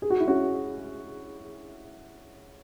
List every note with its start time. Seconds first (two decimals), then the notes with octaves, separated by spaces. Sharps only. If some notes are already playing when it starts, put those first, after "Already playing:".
0.02 G#4
0.10 F#4
0.20 E4
0.27 C#4 F#4